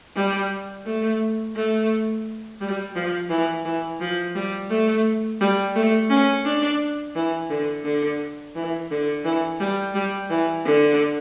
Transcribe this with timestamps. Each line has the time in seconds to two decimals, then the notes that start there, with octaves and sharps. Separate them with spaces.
0.16 G3
0.86 A3
1.55 A3
2.61 G3
2.95 F3
3.30 E3
3.66 E3
4.00 F3
4.35 G3
4.70 A3
5.41 G3
5.76 A3
6.10 C#4
6.45 D4
7.15 E3
7.50 D3
7.85 D3
8.55 E3
8.91 D3
9.25 E3
9.60 G3
9.95 G3
10.30 E3
10.65 D3